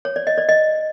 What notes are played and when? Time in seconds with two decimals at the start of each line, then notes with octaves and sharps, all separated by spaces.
0.05 C#5
0.16 D5
0.27 D#5
0.38 D5
0.49 D#5